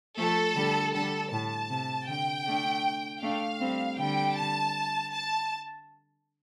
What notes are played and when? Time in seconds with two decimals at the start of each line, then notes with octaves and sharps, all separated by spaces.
0.18 F3 A3 A4
0.56 D3 G3
0.94 D3 G3 A4
1.32 A2 A5
1.70 C3
2.09 D3 G5
2.47 A3 D4
3.22 A3 D4 F5
3.60 G3 C4
3.98 D3 G3 G5
4.37 A5
5.13 A5